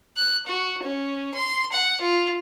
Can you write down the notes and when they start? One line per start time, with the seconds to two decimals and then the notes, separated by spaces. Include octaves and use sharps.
0.17 F#6
0.47 F#4
0.83 C#4
1.34 C6
1.72 F#5
2.01 F4